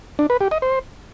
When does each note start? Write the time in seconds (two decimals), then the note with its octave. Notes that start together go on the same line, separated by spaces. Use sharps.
0.19 D4
0.30 B4
0.41 G4
0.51 D#5
0.62 C5